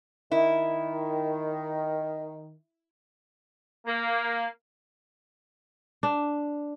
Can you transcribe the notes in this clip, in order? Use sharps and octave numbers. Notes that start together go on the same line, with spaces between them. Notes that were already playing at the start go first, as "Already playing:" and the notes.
D#3 E4
A#3
D4